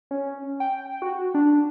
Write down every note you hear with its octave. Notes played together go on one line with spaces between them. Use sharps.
C#4
G5
F#4
D4